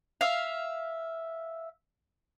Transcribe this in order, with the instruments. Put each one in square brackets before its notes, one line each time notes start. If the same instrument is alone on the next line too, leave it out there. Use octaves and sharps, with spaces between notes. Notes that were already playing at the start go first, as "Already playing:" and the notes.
[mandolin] E5 F5